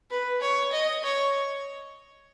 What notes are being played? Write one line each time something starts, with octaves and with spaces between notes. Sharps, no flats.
B4
C#5
D#5
C#5